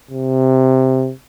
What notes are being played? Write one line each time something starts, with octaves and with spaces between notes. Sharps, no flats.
C3